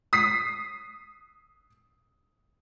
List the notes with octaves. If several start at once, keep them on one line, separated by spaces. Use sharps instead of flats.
D#6 B6 C7